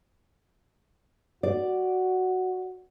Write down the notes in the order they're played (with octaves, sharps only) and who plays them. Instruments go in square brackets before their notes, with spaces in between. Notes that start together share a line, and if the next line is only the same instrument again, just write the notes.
[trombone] F#4 [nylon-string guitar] D5